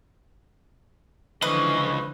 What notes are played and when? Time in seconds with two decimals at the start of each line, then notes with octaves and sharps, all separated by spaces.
1.42 C#2 D3 E3 F3 B4 D#5 C#6